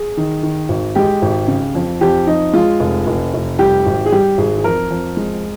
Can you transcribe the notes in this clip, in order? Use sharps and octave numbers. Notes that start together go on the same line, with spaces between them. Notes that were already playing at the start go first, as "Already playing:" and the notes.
Already playing: G#4
D#3
D#3
G#1
G#3 G4
G#1
C#3
F2
F2 G4
F2 D#4
G#3 F4
F1
F1
F1
G3 G4
G#1
G#4
G3 G4
G#1 G#4
G#4
F2 A#4
F2
G#3